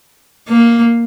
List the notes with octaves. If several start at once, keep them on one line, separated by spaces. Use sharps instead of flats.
A#3